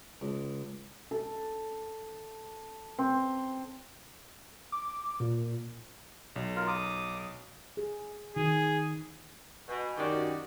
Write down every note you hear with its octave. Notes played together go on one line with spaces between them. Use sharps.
C#2
A4
C4
D6
A#2
B1
F4 A#4
D6 D#6
G#4
D#3 G#4
B2 B4 G#5 C#6
F#2 D#3 F#4 G4 D5